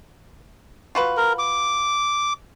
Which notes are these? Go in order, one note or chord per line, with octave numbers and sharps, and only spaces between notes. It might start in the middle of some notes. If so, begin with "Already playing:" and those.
F4 F#4 B4
A#4
D6